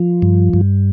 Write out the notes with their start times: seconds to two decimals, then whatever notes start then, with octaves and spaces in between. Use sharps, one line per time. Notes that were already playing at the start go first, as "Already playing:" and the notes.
Already playing: F3
0.22 G2
0.53 G2